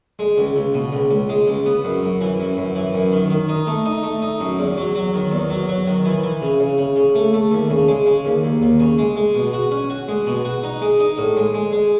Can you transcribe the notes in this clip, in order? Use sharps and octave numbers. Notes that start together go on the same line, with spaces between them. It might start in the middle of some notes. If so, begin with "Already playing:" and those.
G#3
C#2
C#2
B2
C#2
C#2
G#3
C#2
B3
F#2
F#2
E3
F#2
F#2
E3
F#2
D#3
D#3
D#4
A3
D#4
A3
D#4
F#2
E2
F#3
F#3
D#3
E2
F#3
F#3
D#3
E3
E3
C#3
C#3
C#3
C#3
A3
A3
D#2
C#3
G#3
C#3
D#2
D#2
D#2
C#3
G#3
G#3
B2
F#4
C#4
F#4
G#3
B2
F#4
D#4
G#3
D#4
A2
G#3
G#3
G#3